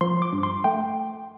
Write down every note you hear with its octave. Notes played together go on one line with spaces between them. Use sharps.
F3 C6
D6
G2
C6
A3 G5